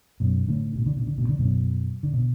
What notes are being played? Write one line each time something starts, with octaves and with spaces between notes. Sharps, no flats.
F#2 B2
A2 D3
B2
D3
B2
D3
B2
D3
F#2 B2
D3
B2